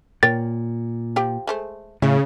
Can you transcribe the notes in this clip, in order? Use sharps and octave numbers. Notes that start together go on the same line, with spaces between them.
A#2 A#4 C#5 G5 A6
F3 G4 G5
G#3 A3 C5
A2 C#3 E5